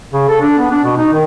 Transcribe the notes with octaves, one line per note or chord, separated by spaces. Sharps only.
C#3
A4
D4
B3
D4
B2
D#4
D#3